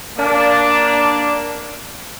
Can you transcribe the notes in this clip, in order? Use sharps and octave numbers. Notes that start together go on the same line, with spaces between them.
A#3 D4